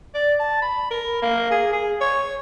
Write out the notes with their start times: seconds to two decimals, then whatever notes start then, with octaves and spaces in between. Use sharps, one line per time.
0.15 D5
0.40 A5
0.62 B5
0.91 A#4
1.22 A#3
1.51 G#4
1.73 G#4
2.01 C#5